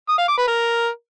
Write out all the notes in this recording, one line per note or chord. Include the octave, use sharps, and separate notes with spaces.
D#6
F5
D6
B4
A#4